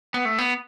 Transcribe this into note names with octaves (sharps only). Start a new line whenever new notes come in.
B3
A3
B3